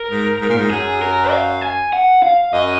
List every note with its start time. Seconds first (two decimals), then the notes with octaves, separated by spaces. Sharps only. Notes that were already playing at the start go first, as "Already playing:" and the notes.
Already playing: A#4
0.10 G#2
0.41 G#2
0.49 A#2
0.57 G#2
0.70 F#2 G#4
1.02 A#4
1.31 F5
1.62 G#5
1.93 F#5
2.22 F5
2.53 F#2 D#5